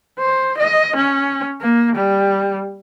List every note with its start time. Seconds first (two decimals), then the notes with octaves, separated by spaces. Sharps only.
0.19 C5
0.58 D#5
0.96 C#4
1.61 A#3
1.96 G3